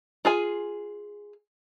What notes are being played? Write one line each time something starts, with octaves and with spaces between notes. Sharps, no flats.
F4 G#4 G#5